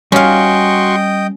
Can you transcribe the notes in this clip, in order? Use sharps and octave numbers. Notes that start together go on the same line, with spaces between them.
G3 C#4 F#4 D#5 F5 G5 C6 C#6